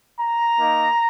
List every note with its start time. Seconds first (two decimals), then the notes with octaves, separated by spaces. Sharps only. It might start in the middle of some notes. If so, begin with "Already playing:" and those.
0.20 A#5
0.60 A#3 D#4